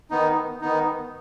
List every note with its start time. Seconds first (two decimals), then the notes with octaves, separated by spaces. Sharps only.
0.10 D#3 B3 D#4
0.61 D#3 B3 D#4